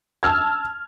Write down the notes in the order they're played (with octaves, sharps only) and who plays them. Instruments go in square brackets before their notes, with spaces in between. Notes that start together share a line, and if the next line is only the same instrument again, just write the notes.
[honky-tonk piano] A5 E6 F6 G#6